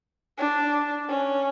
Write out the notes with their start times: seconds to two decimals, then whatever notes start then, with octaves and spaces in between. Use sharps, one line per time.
0.38 D4
1.08 C#4